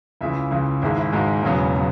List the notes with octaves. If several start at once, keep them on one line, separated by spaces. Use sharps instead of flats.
C#2 C#3 E3 E5
C#2 C#3 E3
G#1 G#2 G#3 E4
E4
G#1 G#2 G#3 F#4
E1 E2 C#3 F#3 B3
C#3 F#3